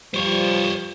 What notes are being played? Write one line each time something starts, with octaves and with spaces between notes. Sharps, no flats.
F3 G3 C5 C#5